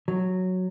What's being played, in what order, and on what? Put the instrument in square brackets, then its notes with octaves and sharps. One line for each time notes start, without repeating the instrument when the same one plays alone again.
[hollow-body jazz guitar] F#3